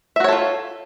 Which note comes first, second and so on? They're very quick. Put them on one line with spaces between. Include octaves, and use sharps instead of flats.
E5 F#4 C#5 A4 F4